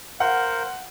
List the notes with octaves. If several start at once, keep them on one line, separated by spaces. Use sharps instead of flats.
A#4 C5 F5 F#5